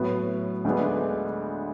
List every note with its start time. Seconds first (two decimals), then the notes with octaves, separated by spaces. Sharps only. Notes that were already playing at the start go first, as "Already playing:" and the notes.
Already playing: A2 F#3 B3
0.65 D2 D3 G#3 B3 D4